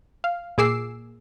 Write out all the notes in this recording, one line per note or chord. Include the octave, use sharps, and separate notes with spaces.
F5
A#2 G#4 D6 E6 C7